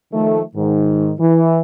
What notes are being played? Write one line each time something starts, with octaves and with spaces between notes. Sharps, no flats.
D#3 F3 A3
G#2 D#3
E3